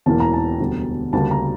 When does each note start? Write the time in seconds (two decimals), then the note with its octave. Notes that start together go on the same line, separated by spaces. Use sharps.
0.06 E1 E2 E3 A#3 A5
0.20 A#5
0.33 A5
0.59 E1 D2 D3 G3
1.13 D2 C#3 G3 A#3 A5
1.31 A#5